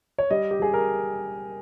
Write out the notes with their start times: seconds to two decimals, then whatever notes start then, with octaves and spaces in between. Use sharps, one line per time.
0.18 C#5
0.30 G3 D#5
0.51 G4
0.60 G3 G#4
0.74 A#4